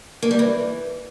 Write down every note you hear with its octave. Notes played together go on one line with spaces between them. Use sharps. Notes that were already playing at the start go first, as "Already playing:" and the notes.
A#3
G3
E3